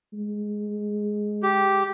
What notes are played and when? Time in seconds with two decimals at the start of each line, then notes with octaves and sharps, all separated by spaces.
0.13 G#3
1.43 G4